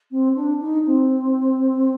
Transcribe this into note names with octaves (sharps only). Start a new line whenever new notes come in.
C4
D4
D#4
C4